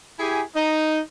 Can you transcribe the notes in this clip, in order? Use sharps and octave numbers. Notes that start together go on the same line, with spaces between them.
E4 G4 G#4 G#5
D#4